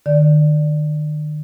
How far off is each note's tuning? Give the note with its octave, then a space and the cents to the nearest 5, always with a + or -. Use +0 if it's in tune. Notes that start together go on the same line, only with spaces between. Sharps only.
D#3 -45 D5 +0